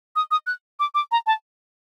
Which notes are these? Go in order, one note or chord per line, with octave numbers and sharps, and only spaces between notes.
D#6
D#6
F#6
D6
D6
A#5
A5